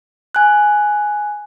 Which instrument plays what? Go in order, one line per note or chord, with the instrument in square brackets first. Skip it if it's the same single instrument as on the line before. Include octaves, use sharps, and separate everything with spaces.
[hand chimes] G#5 F#6